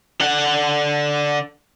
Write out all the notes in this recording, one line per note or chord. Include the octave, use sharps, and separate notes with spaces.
D3 F#5